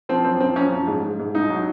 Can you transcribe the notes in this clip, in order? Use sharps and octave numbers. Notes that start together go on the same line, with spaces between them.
F3 C4
F#2 C4
F3 C4
F#2 C#4
F3
G#2
G#2
G#2
C2 D#4
F#3